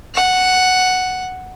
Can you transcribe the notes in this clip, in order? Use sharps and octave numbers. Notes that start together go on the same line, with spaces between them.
F#5